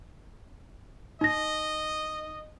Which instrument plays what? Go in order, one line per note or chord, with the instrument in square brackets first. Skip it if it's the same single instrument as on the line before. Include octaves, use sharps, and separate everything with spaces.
[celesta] D#4 A#6 [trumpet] D#5